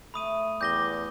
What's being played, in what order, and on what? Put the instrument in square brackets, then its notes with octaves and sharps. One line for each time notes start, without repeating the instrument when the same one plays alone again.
[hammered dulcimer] A3 [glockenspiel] B5 D#6 D#7
[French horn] E2 [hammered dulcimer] G3 [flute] D6 [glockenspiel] G6 A#6 G7